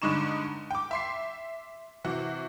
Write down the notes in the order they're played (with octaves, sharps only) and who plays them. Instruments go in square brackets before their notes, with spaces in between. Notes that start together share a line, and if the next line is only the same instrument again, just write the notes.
[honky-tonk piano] G2 D3 G#3 D#4 C#6 E7
G5 D6
E5 C6 C7
C3 E3 F#4